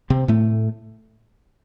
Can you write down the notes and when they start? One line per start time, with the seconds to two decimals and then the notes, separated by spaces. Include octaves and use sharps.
0.10 C3 C4
0.28 A2 A3